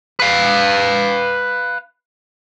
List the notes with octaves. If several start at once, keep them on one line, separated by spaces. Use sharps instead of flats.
B4 F5